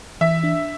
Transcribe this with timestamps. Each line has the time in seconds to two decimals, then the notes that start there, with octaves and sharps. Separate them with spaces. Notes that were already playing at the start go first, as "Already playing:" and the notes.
0.21 E3 E5
0.43 D4